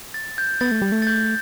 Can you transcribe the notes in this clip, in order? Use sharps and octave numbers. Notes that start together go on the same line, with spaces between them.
A6
G6
B3 A6
A3
G3
A3
A6
G6